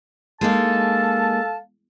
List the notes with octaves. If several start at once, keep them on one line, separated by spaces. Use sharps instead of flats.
G#3 A#3 D#4 A4 F5 A5